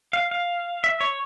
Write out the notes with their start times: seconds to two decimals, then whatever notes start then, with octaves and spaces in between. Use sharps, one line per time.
0.13 F5
0.31 F5
0.84 E5
1.01 C#5